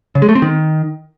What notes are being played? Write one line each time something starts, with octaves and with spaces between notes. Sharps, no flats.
C#3
G#3
A3
C4
D#3